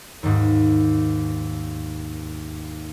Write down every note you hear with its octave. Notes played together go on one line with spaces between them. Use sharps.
D#2 G#2